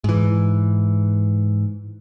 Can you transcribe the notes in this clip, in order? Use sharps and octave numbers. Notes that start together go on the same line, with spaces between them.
G#2 E3